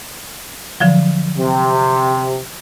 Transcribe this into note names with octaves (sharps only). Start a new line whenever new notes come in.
D3 F3 F#3
C3